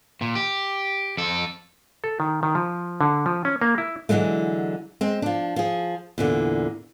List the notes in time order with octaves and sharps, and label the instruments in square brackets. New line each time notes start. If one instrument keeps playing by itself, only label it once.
[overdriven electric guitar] A#2
G4
F2 A4
[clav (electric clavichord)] A4
D#3
D#3
F3
D3
F3
C#4
A#3
E4
[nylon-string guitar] D3 E3 F#3 G#3 A3
G#3 C4
F3 D4
F3 G#4
E2 A#2 D3